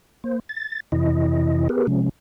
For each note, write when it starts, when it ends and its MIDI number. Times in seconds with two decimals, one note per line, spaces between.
0.24 0.39 58
0.24 0.39 72
0.49 0.80 93
0.92 1.68 41
0.92 1.68 48
0.92 1.68 52
0.92 1.68 64
0.92 1.68 75
1.69 1.87 59
1.69 1.87 67
1.69 1.87 68
1.69 1.87 70
1.69 1.87 71
1.87 2.09 48
1.87 2.09 53
1.87 2.09 56
1.87 2.09 61